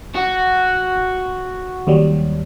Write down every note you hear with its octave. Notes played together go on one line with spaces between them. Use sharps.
F#4
D#2 F#3 G3